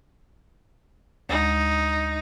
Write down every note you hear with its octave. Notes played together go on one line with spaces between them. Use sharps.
D2 G#3 D#4